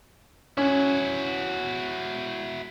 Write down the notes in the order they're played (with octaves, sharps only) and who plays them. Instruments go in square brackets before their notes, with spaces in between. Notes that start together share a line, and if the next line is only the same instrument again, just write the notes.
[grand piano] C#4 [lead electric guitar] E4 F#4